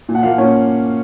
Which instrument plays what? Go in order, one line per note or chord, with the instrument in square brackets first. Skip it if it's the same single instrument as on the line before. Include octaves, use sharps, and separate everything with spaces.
[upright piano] A#2
F#5
F3 A#3 F4 F5
A#2 C#4 C#5